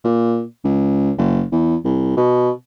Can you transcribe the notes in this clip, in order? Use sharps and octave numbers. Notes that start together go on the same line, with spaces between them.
A#2
C#2
F#1
E2
C2
B2